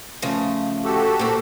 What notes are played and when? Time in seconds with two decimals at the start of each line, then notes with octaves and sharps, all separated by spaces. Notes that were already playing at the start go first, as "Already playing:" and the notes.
0.22 C#3 F3 A3
0.84 F#4 G4 A4
1.19 A#2 C4